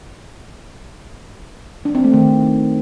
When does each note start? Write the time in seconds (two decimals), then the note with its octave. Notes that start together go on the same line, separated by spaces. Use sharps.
1.85 D4
1.95 C4
2.04 A3
2.14 D#3